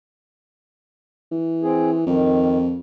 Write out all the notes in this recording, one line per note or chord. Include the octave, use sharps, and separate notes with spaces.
E3
C4 G#4
F2 D#3